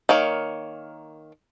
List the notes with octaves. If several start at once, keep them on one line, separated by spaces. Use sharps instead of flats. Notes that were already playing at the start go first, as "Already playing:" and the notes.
D#3 A#3 C#5